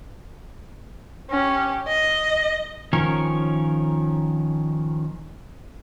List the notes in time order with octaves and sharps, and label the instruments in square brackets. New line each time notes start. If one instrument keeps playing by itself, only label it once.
[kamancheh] C#4 G4
D#5
[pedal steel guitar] D#3 F3 C#4 A#4 C#5